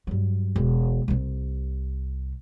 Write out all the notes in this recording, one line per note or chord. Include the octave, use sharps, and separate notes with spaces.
G2 F#3
E1
C2 C3